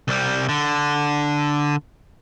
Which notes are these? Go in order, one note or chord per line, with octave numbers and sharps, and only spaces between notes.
C2 G3
D3